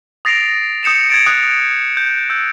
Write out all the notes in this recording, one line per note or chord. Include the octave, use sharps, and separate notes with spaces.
D#6 A6 A#6 C7 D7 F7
D#6 G6 C#7 E7 F7
G#6 A6 D7
D#6 F#6 G#6 D7
G6
E6 G6